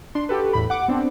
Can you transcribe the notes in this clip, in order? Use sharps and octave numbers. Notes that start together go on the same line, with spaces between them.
D4 C6
F#4 G4 A4 B4
E2 A2 B5
F#5 D6
B3 C4 D4